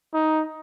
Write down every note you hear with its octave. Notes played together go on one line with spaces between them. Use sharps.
D#4